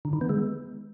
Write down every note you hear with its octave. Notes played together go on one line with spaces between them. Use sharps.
D3
D#3
B3
G#3